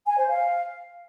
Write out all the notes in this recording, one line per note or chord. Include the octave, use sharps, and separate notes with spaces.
G#5
C5
F5